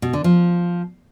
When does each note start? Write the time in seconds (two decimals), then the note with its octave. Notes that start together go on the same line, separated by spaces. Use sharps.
0.02 B2
0.13 D3
0.24 F3